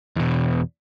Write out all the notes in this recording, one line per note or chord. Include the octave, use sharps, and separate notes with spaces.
E2 B2